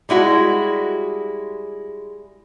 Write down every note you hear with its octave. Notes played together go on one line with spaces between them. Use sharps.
G3 G#3 E4 F#4